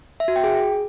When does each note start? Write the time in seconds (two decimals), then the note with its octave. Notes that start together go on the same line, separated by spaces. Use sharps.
0.20 E5
0.28 F#4
0.36 G5
0.44 G#4